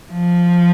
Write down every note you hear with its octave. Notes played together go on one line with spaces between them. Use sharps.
F3